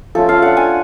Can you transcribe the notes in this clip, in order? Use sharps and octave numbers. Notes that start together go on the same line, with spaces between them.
F3 A3 C#4 F4 A4
F5
A3 D4 F4 F#5
G#5